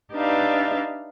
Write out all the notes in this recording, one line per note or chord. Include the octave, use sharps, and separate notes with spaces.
D4 D#4 G4 B4 E5 F5